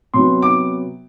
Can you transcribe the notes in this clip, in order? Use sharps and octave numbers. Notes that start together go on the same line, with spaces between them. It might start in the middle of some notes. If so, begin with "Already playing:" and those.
C3 F#3 B3 C6
D6